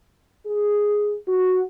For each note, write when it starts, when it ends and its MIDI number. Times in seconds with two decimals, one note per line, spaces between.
0.46 1.15 68
1.28 1.62 66